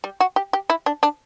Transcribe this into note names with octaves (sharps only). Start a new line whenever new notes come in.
G3
F#4
G4
G4
E4
D4
D4